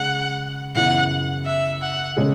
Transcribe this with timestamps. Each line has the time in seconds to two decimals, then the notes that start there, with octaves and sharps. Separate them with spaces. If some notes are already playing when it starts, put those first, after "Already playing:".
Already playing: C#3 G#3 F#5
0.75 F#2 C#3 E3 B3 E4 F#5
1.46 E5
1.82 F#5
2.17 C#3 G#3 C#4 G#4